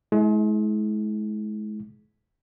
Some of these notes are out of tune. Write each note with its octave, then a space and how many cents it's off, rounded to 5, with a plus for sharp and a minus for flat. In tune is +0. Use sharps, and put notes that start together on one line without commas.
G#3 +40 E4 -25